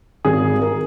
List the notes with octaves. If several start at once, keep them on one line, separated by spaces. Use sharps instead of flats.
G#1 G#4
A#4